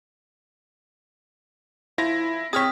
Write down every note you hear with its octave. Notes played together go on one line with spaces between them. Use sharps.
F3 E4 A#6
C4 G#4 C#5 D#6 F6 B6